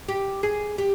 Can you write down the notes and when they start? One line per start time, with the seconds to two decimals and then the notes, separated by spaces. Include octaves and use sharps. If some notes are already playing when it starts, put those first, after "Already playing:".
0.08 G4
0.43 G#4
0.78 G4